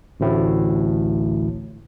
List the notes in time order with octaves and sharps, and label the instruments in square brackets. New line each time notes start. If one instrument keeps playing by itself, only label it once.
[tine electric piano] A1 D2 A2